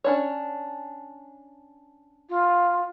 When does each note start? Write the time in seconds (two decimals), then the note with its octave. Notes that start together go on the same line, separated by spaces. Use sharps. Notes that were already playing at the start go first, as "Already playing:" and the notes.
0.04 C#4 D4 C#5
2.29 F4